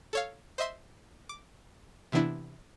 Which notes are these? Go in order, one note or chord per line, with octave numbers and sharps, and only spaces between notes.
A4 C#5 F5
C5 D#5 E5 C6
D6
C3 E3 B3 D4 E4